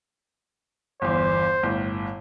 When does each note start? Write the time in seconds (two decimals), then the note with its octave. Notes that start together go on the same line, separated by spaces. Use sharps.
1.02 G1 E2 C5
1.63 G1 A2